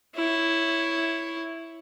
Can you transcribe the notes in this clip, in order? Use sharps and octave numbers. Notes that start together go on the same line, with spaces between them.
E4 C#5